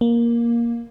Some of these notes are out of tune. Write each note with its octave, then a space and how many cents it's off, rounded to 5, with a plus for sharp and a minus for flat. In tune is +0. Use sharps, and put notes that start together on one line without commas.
A#3 +10